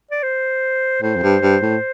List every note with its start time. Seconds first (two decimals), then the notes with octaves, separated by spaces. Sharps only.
0.11 D5
0.23 C5
1.02 A2 C5
1.16 F2
1.23 G2
1.42 G2
1.62 A2